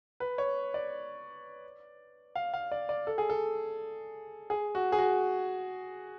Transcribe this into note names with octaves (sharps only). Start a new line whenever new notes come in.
B4
C#5
D5
F5
F5
D5
D5
A4
G#4
A4
G#4
F#4
G#4
F#4